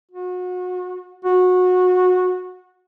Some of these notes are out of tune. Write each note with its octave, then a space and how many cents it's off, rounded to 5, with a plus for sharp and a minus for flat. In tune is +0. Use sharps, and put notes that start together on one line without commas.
F#4 -30
F#4 -20